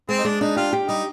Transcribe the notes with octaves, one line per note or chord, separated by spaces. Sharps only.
G#3 C4
D#4
G#3 D4
D4 D#4
F4 G4
G4
G3 D#4